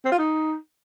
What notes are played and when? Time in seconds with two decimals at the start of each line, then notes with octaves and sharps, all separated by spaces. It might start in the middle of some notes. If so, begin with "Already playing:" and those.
0.05 C4
0.12 F4
0.18 D#4